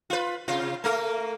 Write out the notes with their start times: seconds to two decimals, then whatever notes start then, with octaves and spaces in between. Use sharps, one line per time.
0.10 F4 B4
0.48 C3 F4
0.84 A3 A#3 A#4